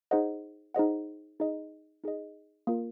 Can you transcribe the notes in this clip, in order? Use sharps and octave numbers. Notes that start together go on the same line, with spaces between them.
D#4 G#4 C5 D#5 F#5
D#4 G#4 C5 D#5 F#5
D#4 G#4 D#5
D#4 G#4 D#5
A#3 F4 A#4